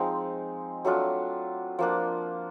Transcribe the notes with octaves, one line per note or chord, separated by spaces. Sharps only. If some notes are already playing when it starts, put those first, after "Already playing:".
Already playing: F3 G#3 C4 D#4
F#3 A3 D4 F4
F3 A#3 D4